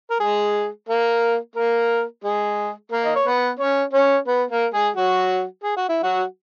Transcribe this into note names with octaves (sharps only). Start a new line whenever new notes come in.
A#4
G#3 G#4
A#3 A#4
A#3 A#4
G#3 G#4
A#3 A#4
D#5
C#5
B3 B4
C#4 C#5
C#4 C#5
B3 B4
A#3 A#4
G#3 G#4
F#3 F#4
G#4
F#4
E4
F#3 F#4